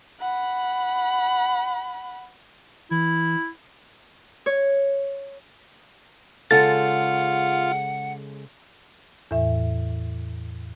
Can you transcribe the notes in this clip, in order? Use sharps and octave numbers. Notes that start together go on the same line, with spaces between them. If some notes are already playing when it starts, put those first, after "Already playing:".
F#5 B5
E3 E4
C#5
C#3 G#3 F4 A4 F#5 A6
E2 A2 E3 E5